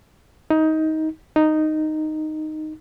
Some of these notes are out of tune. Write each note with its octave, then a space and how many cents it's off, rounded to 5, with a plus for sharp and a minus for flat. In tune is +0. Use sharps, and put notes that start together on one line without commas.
D#4 +20
D#4 -5